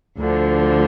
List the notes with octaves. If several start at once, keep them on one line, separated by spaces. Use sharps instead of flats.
D2 D3 F3